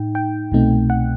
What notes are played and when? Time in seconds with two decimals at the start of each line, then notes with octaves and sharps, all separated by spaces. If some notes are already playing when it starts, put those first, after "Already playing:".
Already playing: A2 D#4 G5
0.15 G5
0.52 C2 B2 A3 C4 D#4
0.90 F#5